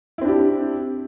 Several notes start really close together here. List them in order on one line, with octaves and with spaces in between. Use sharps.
E4 C4 D4 G4